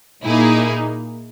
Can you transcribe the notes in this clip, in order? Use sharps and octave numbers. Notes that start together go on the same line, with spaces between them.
A#2 A#3 D#4 E4 G#4